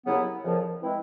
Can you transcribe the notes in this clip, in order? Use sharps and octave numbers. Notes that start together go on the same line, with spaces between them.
D#2 C#3 F#3 B3 E4
F2 C#3 F3 A#3
E3 G#3 C4 E4